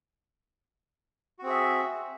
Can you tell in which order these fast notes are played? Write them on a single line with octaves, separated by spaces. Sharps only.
F#4 C4 G#4 E5